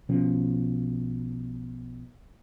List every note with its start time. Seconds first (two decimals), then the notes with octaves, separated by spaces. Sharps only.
0.09 B1 B2 F3 C#4